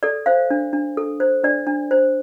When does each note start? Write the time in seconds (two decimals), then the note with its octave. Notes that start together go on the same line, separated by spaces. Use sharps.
0.03 A4 D5
0.26 C5 F5
0.50 D4
0.73 D4
0.97 A4
1.20 C5
1.43 D4 D5
1.67 D4
1.91 C5